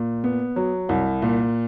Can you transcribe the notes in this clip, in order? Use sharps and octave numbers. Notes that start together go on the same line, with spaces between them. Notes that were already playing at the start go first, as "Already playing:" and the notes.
Already playing: A#2
B3
F#3
C2
A#2